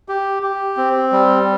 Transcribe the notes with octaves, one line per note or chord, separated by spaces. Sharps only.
G4
G4
C4
G3